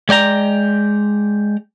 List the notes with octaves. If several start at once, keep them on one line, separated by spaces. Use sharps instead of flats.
G#3 D5 G5 A#5